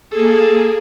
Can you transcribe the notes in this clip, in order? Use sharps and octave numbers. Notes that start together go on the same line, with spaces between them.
A#3 G#4 A4